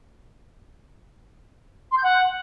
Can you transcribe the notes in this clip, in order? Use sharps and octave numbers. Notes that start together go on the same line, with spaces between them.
C6
G6
F#5